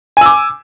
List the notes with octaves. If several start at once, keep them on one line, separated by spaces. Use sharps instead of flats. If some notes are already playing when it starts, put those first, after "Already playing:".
G#5 D6 E6